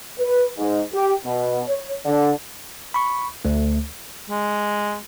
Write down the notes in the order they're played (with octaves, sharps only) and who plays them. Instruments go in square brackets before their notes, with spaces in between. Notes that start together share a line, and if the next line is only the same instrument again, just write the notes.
[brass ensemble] B4
G#2
G4
B2
C#5
D3
[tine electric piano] B5 C#6
D2 A3
[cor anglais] G#3